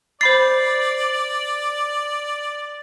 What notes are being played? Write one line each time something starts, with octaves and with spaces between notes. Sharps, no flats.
C5 D5 B5 A6 C7